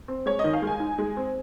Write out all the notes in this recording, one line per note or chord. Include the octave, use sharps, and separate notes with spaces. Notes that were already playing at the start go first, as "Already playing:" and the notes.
C4
G#3 C#5
D#5
D#3
F5
G#3
G#5
D#4
G#3
C4